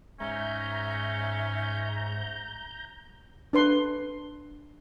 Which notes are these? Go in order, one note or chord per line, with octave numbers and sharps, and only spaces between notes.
G#2 C#4 E5 A#5 G6
D4 B4 C6